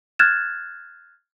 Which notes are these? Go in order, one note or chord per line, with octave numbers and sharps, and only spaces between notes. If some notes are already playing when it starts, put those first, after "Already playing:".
F6 F#6 G#6 A6 E7